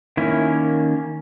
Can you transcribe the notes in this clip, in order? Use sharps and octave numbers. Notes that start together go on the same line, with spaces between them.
D#3 A#3 C#4 E4